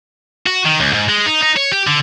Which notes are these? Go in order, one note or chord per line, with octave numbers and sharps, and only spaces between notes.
F#4
D#3
C#2
G#2
G#3
D#4
D#4
C#5
G4
D3